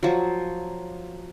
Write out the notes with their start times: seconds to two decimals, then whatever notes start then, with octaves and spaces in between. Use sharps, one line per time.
0.03 F3 F#3